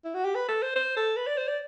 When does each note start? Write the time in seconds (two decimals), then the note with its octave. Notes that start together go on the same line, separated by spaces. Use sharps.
0.04 E4
0.14 F#4
0.24 G4
0.35 B4
0.48 A4
0.62 C5
0.76 C5
0.96 A4
1.16 B4
1.27 D5
1.37 C5
1.48 D5